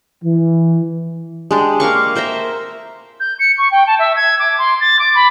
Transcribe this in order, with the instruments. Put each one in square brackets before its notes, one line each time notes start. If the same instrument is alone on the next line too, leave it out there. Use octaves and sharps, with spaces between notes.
[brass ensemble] E3
[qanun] G#3 D4 G4
A#3 A#4 F5 C#6
A#4 C5 E5 A#5
[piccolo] G6
C#7
C#6
G5
A5
E5
G#6
D6
C6
A6
D6
B5